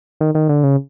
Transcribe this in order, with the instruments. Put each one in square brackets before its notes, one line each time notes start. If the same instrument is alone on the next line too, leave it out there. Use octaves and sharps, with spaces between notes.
[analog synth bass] D#3
D#3
D3
C#3